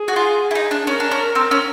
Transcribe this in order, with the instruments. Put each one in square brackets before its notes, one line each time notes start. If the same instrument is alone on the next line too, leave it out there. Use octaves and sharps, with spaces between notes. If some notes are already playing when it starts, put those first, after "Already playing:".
Already playing: [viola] G#4
[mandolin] F#4
F4
E4
D#4
D4
[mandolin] C#4 [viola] A#4
[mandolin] D4
C#4
C4
C#4